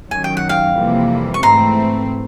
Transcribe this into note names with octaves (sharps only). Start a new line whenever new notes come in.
F#2 D#3 F#3 G#5
G5
F#5
F5 G5
F2 C3 E3 G3 A#3
C#6
G#2 E3 A3 C4 A#5 C6